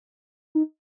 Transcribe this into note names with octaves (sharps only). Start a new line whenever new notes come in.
D#4